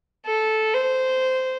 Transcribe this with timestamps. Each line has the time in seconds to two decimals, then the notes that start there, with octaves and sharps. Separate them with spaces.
0.26 A4
0.74 C5